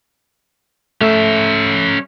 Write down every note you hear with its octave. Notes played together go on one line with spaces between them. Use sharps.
A3 C#4 E5